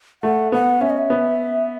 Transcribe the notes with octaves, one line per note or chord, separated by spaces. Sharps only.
A3 F#5
B3 F#5
C#4 E5
D#5
E5
B3